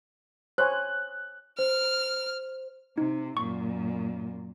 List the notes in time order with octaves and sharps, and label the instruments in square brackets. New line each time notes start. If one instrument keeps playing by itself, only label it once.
[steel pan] C5 C#5 G#5 [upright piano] F#6
[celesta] C5 [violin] F6
[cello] C3 [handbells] D#4
[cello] F#2 A#2 [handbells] C#6